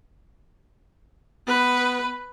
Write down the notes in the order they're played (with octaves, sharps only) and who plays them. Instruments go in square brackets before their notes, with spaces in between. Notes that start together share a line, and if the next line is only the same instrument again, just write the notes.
[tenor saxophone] B3 [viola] B4